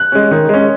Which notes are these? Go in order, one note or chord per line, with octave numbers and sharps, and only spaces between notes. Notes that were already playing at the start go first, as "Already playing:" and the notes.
Already playing: F#6
G#3 C#4
D#3
G#3 C#4